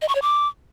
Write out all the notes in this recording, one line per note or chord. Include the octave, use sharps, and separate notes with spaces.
D#5
C#6
C#5
D6